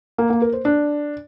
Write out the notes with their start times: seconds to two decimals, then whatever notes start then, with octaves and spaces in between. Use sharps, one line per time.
0.18 A#3
0.30 A#3
0.42 A#4
0.53 C5
0.65 D4